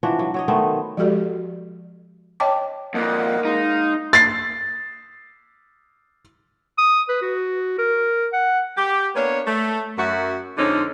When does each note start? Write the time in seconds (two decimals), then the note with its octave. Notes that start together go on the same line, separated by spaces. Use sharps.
0.03 E3 F3 D4 F#4
0.19 F#3
0.34 F#3 C#5 D#5
0.48 D#3 A3 B3 C5
0.97 F3 G#3 F#4 G4 A4 D5
2.40 C#5 D#5 G5 A5 D6
2.94 F2 A#2 A#3 D#5 F#5
3.45 G#3 D#4 F5
4.13 A6 C7
6.78 D#6
7.09 B4
7.22 F#4
7.78 A#4
8.33 F#5
8.77 G4
9.15 A#3 B3 D4 C#5
9.47 A3
9.98 F#2 F#4 E5
10.58 F2 D3 G#3 C4 C#4 D#4